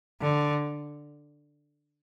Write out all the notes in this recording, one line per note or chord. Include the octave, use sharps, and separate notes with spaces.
D3